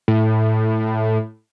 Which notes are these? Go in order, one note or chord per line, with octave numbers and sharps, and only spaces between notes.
A2